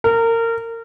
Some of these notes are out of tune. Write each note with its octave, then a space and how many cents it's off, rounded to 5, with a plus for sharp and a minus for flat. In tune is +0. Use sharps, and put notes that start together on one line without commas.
A#4 -25